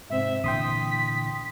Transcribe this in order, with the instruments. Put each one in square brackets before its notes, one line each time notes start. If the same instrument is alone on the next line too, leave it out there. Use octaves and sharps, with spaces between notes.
[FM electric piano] G#2 C3 C4 [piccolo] E5
[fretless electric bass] A#2 D3 E3 [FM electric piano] G5 C6 D#6 [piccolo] B6